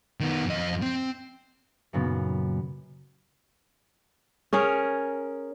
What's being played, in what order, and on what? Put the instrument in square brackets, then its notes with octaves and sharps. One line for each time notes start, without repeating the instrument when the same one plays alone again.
[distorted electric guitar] D#3 B3
F2 D#5
C4
[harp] F#2 A#2 C#3 B3
[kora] C#4 G#4 A#4 C#5